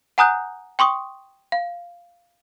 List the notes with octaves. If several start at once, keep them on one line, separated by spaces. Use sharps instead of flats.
F#5 G#5 A#5 D#6 F#6 G6
G5 C6 C#6 D#6
F5